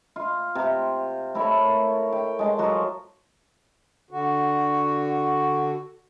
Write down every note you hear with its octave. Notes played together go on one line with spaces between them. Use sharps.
F4
C3
A3 E4 A#4 C#5
G5
G#3 A5
F3 F#3 F#4
D3 F#4